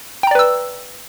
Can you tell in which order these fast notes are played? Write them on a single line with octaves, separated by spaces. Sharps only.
G5 A#5 D5 B4 E6